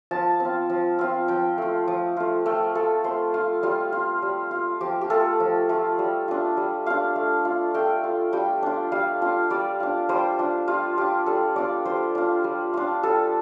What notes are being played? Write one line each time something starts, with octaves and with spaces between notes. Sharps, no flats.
F3 A5
C4 F4
F3
C4 F4
F3 G5
A3 F4
F3
A3 F4
A3 G5
F4 A4
A3 C5
F4
G3 F4
F4
G3
F4
F3 G4
G4
A3 F4 A4
F3
A3 F4
G3
D4 F4
G3
D4 F4 F5
A3
F4
A3 G5
F4
G3 G5
D4 F4
G3 F5
D4 F4
G3 D5
D4 F4
G3 C5
D4 F4
G3 F4
D4 F4 G4
G3 A4
D4 F4 D5
G3 C5
D4 F4
G3
D4 F4
G3 A4